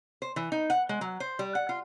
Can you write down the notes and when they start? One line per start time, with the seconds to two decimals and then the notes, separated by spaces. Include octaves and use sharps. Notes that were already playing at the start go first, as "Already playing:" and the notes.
0.22 C5
0.36 E3
0.52 D#4
0.70 F#5
0.89 G#3
1.01 F#3
1.20 C5
1.39 G3
1.55 F#5
1.69 F4